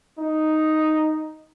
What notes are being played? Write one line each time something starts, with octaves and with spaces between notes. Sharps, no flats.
D#4